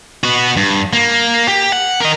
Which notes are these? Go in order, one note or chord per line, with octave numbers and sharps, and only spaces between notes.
B3 F#4
G2
A#3
G4
F#5
A#4 D#5